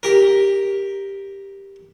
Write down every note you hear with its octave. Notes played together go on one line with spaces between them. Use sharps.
G4 A#4